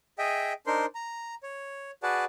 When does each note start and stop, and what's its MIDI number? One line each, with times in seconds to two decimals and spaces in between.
0.18 0.53 68
0.18 0.53 75
0.18 0.53 76
0.18 0.53 79
0.67 0.86 62
0.67 0.86 63
0.67 0.86 70
0.67 0.86 72
0.67 0.86 84
0.95 1.35 82
1.43 1.91 73
2.03 2.25 66
2.03 2.25 68
2.03 2.25 71
2.03 2.25 74
2.03 2.25 78
2.03 2.25 81